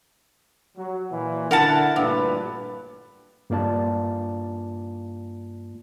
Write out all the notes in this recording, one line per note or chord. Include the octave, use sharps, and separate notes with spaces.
F#3
A#2 E3
D3 E4 A#4 F#5 A5
A1 G2 A#2 B4
G2 A#3 F4 D5 A5